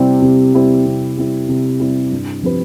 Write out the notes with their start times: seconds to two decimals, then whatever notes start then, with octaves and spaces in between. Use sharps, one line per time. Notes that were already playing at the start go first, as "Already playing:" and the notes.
Already playing: C3 G3 C4 E4 G4
0.22 C3
0.54 G3 C4 E4 G4
0.86 C3
1.17 G3 C4 E4 G4
1.49 C3
1.80 G3 C4 E4 G4
2.12 G2
2.43 F3 C4 G4 B4